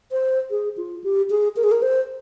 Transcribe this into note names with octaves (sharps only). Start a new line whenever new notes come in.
C5
G#4
F4
G4
G#4
A#4
G#4
A#4
C5